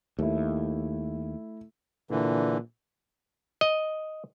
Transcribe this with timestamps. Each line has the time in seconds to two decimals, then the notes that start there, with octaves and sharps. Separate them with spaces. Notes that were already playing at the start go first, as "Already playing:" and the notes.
0.19 D#2 A3 E4
2.10 A#2 D3 E3
3.61 D#5